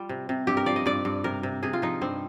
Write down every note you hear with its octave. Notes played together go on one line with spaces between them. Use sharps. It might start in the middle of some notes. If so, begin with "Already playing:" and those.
Already playing: G3 F4
C3
C3
G2 G4
A#4
F3 D5
D#5
G2 D5
G2
C3 A#4
C3
C3 G#4
F4
F3 D#4
G2 C4